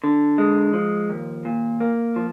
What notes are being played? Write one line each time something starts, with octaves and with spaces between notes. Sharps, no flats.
D3
G#3
F3
D#2
A#2
A#3
F3